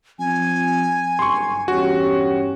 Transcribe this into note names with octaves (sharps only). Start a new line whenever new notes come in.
F3 C4 G#5
F#1 G2 C6 C#6
E2 G2 C#4 F#4 G4